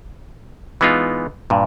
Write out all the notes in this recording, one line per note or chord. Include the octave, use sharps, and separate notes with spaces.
E3 G#3 B3 D#4 F4
G2 A#2